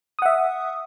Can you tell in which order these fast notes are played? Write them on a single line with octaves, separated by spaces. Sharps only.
D#6 F#5 E5